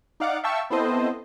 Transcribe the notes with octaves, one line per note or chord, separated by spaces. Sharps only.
D#4 D5 F5 F#5 D6
E5 F5 G5 A5 C#6 E6
B3 C4 E4 A4 C5 D#5